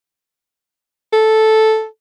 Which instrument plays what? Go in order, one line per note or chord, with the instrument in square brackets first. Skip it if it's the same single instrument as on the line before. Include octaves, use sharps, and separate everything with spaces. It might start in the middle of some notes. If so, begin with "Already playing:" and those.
[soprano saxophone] A4